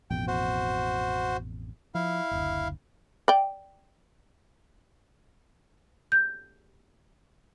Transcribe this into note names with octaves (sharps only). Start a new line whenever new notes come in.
A1 F2 B2 G5
F#4 C5
F3 E4 F5
F#1 D2
D5 G5
G6